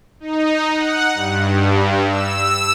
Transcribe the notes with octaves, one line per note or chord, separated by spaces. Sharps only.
D#4
F#5
G2
E6